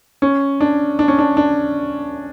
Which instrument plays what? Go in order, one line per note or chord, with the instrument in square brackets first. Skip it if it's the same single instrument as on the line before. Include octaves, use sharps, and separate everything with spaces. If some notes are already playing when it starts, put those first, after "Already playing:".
[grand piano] C#4
D4
D4
C#4
D4
D4